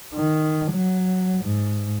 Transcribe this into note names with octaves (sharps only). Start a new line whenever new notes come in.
D#3
F#3
G#2